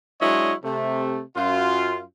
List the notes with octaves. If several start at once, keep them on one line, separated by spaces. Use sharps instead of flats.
F#3 G#3 D4 E4 C#5 D#5
C3 A3
F#2 F4